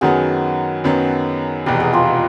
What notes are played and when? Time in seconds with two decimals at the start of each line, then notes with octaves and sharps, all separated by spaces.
0.01 F#2 D#3 F#3 B3 F#4 G#4
0.84 F#2 D#3 F#3 B3
1.66 F1 E2 B2 G4
1.80 G#4
1.93 F4 G4